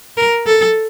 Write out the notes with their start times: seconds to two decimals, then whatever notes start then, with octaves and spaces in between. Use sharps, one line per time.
0.17 A#4
0.47 A4